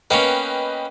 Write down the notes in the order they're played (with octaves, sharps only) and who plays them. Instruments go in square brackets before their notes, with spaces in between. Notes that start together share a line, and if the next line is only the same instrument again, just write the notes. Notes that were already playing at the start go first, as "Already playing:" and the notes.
[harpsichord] A#3 B3 C#4 [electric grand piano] B4 D#5 G5